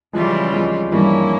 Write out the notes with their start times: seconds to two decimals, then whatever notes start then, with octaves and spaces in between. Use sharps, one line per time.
0.13 C#3 E3 F3 G3 G#3 C#4 F4
0.53 F3 G#3
0.92 G2 E3 F3 G3 A#3 C#4 E4